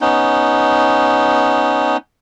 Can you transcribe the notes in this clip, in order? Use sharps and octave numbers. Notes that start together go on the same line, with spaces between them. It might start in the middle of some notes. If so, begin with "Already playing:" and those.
B3 C#4 D#4